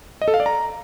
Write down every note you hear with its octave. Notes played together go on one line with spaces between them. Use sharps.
D#5
A4
F5
D5
A#5